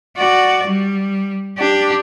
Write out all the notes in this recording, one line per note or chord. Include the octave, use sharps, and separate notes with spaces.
F#4 D5
G3
D4 G4